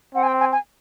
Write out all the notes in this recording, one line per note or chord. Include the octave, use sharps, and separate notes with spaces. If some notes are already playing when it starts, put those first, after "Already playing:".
C4 F#5
G#5
G5
G#5
G#5